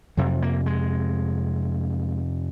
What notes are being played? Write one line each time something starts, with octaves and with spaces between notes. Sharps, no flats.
F2 C3 F#3
A#3
G#3